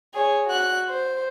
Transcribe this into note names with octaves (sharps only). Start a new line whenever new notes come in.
G#4 C#5
F#4 F#6
C5